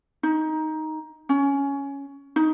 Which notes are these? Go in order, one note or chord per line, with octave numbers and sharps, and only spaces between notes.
D#4
C#4
D#4